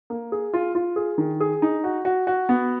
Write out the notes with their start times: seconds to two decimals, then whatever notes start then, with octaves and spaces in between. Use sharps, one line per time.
0.10 A#3
0.32 G#4
0.53 F4
0.75 F4
0.96 G#4
1.18 D#3
1.40 G#4
1.62 D#4
1.84 F#4
2.05 F#4
2.27 F#4
2.49 B3